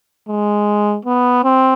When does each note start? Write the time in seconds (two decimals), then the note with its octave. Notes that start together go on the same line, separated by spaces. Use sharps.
0.29 G#3
1.05 B3
1.44 C4